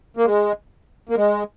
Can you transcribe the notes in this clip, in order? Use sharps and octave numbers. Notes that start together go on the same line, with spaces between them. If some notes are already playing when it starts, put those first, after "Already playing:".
A#3
G#3
A#3
G#3